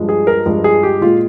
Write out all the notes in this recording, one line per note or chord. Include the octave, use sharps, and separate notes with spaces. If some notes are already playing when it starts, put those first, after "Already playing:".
Already playing: G2 F3 G#3
G#4
A#4
G2 F3 G#3
G#4
G4
A#2 G#3 F4